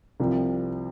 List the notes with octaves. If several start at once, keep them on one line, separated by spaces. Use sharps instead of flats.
C2 C3 F3